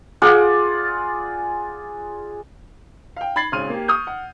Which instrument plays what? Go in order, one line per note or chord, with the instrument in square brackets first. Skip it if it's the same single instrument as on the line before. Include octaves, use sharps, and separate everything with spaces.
[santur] F4 G#4 D5 F#5
[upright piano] F5 G5
B5 G#6 A6 C7 F#7
G#1 C#3 C6 F6 D#7
A#3 G4
C#6 D#6 F6 G6
F#5